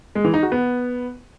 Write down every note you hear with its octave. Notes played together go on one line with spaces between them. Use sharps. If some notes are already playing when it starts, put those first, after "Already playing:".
G#3
E3
D#4
F#4
B3